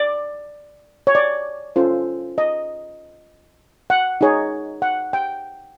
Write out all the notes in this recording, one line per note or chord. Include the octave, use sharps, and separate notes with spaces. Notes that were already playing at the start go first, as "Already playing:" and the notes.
Already playing: D5
C#5
D5
C#4 F4 A4 C5
D#5
F#5
D#4 G#4 C#5
F#5
G5